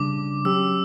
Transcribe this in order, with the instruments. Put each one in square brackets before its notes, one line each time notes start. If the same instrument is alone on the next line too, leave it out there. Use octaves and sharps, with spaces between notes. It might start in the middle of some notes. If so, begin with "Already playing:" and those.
Already playing: [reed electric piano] C#3 G3 D4 [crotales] D6
[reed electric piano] F#3 C#4 G4 [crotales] E6